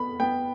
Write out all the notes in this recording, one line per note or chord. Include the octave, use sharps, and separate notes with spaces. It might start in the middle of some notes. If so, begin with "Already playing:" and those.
Already playing: B3 B5
B3 G5